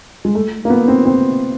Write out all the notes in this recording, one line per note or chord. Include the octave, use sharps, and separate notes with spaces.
G#3
A3
A#3
B3
C4
C4